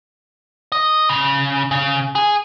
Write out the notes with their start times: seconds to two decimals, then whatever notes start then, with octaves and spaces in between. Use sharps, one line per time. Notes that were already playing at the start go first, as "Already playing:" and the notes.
0.72 D#5
1.09 C#3
1.71 C#3
2.15 G#4